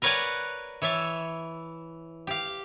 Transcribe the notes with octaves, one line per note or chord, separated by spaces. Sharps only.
A#4 B4 C#5 D5 F#5 G#5
E3 C#5 E5 A5
G4 F5